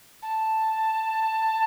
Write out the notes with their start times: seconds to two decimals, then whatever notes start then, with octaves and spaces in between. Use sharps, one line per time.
0.22 A5